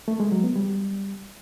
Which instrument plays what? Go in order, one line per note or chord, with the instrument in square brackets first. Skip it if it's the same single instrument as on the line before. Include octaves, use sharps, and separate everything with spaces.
[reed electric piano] A3
G#3
F#3
B3
G3